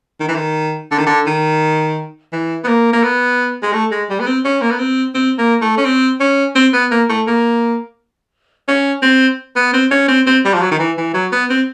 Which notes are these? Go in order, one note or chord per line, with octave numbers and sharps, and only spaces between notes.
D#3
E3
D#3
D3
D#3
D3
D#3
E3
B3
A#3
A#3
B3
G#3
A3
G#3
G3
B3
C4
C#4
A#3
B3
C4
C4
A#3
A3
C#4
C4
C#4
C4
B3
A#3
A3
A#3
C#4
C4
B3
C4
C#4
C4
C4
G3
F3
F#3
D#3
E3
E3
F#3
B3
C4